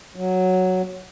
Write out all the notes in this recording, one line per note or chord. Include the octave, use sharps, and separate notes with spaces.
F#3